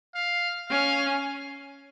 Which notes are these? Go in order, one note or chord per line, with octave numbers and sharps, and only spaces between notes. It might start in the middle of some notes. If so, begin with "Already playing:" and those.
F5
C#4 F5